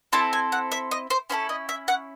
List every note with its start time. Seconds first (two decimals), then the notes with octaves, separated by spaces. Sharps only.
0.13 C4 E4 A4 A5
0.33 G#5
0.52 F#5
0.72 E5
0.91 D#5
1.10 C5
1.30 C#4 E4 A4 C5
1.49 D#5
1.69 E5
1.88 F#5